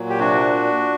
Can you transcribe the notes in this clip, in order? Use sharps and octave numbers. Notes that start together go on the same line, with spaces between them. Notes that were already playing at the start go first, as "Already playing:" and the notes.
Already playing: A#2 F#3
G4
C3 D4 F#4